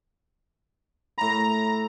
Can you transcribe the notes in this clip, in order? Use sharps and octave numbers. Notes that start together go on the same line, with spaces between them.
A2 A#5 B5